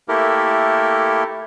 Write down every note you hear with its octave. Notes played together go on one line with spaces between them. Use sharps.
A3 A#3 E4 G4 A4 A#4